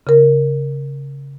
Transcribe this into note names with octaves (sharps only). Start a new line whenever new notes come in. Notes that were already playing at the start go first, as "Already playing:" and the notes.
C#3 A#4